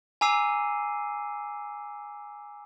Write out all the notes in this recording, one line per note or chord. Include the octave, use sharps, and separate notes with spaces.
G#5 A#5 D6 E6 C7 D#7